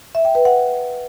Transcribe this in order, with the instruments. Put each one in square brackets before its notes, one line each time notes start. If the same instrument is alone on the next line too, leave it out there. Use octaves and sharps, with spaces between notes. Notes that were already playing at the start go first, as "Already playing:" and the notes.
[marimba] E5
G5
B4
F#5